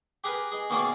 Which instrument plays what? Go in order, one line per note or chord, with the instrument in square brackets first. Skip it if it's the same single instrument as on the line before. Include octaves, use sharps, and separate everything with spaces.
[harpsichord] G4 G#4 A#4 B4 G#5
G#4 D#5
B2 D#3 A#3 C#4 G#4 D5